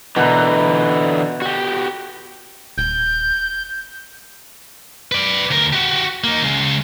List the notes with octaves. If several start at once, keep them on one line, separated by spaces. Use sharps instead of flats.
B2 D3 E3 B4 A#5
F#4 G4
D#1 G6
B4 D5
D2 A#4
F#4 G4
A#3 D#4
C#3 G#3